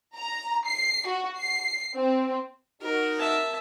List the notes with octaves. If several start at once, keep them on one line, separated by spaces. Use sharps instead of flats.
A#5
C7
F#4
C7
C4
D#4 F#4 A#4
E5 A5